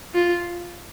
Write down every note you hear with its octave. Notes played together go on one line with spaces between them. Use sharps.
F4